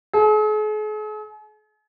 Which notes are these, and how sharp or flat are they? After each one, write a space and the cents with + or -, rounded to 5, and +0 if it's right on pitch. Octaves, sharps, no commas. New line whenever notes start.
G#4 +45